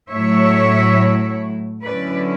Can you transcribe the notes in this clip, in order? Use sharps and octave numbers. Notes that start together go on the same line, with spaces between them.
A2 F#3 A3 E4 C#5 E5
D3 F#3 C#4 E4 B4 D5